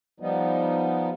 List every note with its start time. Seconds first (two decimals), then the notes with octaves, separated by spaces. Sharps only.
0.20 F3 G3 B3 D#4